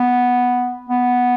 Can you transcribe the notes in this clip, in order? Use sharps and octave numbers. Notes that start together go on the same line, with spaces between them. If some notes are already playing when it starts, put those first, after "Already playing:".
Already playing: B3
B3